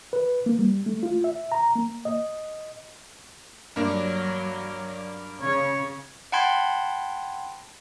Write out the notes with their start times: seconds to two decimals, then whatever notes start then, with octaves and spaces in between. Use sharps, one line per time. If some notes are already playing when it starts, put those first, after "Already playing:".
0.13 B4
0.46 A#3
0.59 G3
0.86 A3
1.03 F4
1.24 E5
1.52 A#5
1.75 A#3
2.05 D#5
3.76 G2 F#3 A#3 D4
5.41 C#3 C#5
6.32 F#5 G5 A5 B5 C6 G#6